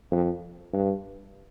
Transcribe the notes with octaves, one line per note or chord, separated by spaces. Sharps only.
F2
G2